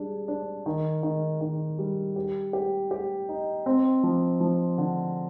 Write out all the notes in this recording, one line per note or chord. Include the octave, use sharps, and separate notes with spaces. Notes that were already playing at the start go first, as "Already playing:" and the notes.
Already playing: G3 D4 G#4
D4
D#3
D#3
D#3
G3
G4
G4
G4
D#4
C4
F3
F3
D3